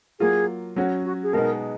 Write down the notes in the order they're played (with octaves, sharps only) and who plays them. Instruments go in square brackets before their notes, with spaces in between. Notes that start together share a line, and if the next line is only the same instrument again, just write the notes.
[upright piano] F#3 A#3 F4 [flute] G#4
[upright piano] F#3 C#4 F#4
[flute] F#4
G#4
[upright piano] B2 G#3 B3 D#4 [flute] A#4